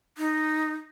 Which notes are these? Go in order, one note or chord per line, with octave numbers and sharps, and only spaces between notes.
D#4